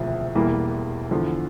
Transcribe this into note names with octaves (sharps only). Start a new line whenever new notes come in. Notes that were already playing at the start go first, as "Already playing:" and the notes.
Already playing: E1 D2 C3 F3
E1 E2 E3 G3 A#3
E2 D3 F3